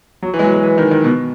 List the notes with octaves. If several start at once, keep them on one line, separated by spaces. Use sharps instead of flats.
F#3
E3
G#3
F#3
G#3
E3
D#3
D#3
B2